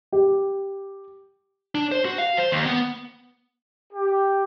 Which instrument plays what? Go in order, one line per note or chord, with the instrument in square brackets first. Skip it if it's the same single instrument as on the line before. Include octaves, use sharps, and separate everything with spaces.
[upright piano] G4
[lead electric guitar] D4
C5
F#4
F5
C5
D#2
B3
[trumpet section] G4